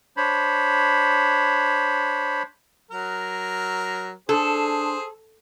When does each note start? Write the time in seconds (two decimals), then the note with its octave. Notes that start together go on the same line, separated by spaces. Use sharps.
0.17 D4 C5 C#5 B5
2.91 F#3 A#4
4.29 D4 G#4 A4 C5